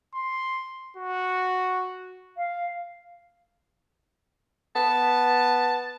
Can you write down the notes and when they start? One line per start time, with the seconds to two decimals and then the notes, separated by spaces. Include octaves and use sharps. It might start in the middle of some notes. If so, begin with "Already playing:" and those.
0.14 C6
0.97 F#4
2.37 F5
4.76 B3 A5